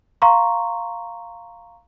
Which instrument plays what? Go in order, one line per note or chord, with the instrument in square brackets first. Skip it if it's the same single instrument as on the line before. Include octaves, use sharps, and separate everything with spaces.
[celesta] F5 A#5 C6 C#6